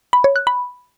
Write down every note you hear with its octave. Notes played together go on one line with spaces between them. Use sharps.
B5
C#5
F#6
B5